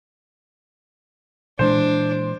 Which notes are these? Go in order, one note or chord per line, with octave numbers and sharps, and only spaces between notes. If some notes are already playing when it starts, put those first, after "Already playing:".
A#2 E3 G#3 D4 C5